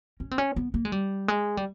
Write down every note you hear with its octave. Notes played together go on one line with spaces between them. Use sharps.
C#4
C4
C#4
B3
A#3
G#3
G3
G#3
G3